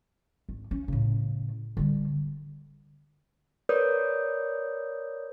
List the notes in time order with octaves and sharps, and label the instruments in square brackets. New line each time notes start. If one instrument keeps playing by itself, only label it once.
[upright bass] G#1
C#4
A2 C#3
D3 G3
[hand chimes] A#4 B4 C#5 D5 D#6 G6